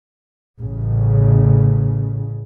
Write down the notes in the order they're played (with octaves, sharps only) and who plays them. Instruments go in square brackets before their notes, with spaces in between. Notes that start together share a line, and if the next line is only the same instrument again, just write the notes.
[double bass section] A1 C#3